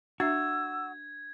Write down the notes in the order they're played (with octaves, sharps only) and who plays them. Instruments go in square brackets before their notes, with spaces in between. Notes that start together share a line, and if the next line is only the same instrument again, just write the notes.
[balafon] D4 E5 [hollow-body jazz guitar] F#4 [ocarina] E6 [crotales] G#6